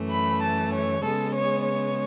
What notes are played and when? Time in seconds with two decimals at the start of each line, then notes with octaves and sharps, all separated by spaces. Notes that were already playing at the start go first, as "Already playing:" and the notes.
Already playing: F#2 E3 A3
0.10 B5
0.41 A5
0.72 C#5
1.02 C#3 G#3 B3 A4
1.34 C#5
1.64 C#5